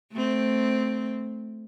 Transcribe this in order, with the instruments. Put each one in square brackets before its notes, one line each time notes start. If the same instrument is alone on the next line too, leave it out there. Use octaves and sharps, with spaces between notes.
[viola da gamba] A3 C4